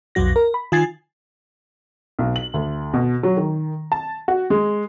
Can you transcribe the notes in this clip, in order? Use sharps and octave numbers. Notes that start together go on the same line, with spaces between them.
B1 F2 F#3 F#4 A#6
A#4
B5
D#3 F4 G#5 G#6 A6 C7
B1
F#7
D2
B2
F#3
D#3
A5
F#4
G#3